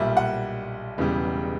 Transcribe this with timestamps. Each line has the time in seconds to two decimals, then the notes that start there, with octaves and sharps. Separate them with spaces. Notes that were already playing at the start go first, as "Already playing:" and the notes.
Already playing: B1 A#2 G3 E5
0.17 F#5
0.98 E1 E2 C#3 G3